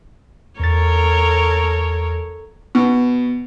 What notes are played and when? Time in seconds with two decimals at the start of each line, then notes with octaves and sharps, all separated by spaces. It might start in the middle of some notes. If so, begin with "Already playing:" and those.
0.60 E2 A4 A#4 C#5 A6
2.75 B2